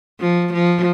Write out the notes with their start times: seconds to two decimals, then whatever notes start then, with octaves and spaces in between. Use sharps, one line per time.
0.20 F3
0.53 F3